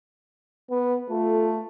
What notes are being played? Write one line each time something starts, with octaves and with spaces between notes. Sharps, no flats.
B3
A3 F4 A4